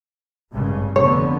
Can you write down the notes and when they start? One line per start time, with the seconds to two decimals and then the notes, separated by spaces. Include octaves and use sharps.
0.53 G#1 G2 C#3
0.96 F1 D3 B3 C#5